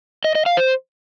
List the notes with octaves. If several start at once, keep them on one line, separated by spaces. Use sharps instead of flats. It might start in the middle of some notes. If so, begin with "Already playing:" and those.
D#5
D#5
F5
C5